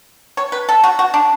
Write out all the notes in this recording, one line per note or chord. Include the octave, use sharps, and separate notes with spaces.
C#5
B4
A4
F#4
F#4
D4